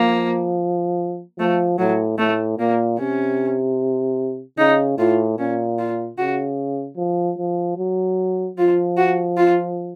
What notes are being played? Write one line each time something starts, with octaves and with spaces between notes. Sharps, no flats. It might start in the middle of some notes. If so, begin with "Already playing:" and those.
Already playing: F3 A#3
F3 A3
A2 F#3
A2 A3
A#2 A#3
C3 C#4
C#3 D#4
A2 F4
A#2 C#4
F4
C#3 F#4
F3
F3
F#3
F3 F4
F#4
F4